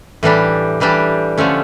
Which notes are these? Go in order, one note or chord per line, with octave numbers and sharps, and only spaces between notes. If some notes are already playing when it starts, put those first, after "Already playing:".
A2 E3 G3 D4 G4
A2 E3 G3 D4 G4
D3 F3 A3 C#4